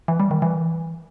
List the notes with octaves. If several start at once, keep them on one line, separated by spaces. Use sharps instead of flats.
E3
G3
D#3
E3